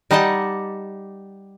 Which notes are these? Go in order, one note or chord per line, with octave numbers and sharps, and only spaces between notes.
G3 D#4 G4 D#5 F#5 A5